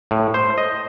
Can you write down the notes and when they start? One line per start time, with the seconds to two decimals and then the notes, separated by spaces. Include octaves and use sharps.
0.11 A2
0.34 C5
0.58 D#5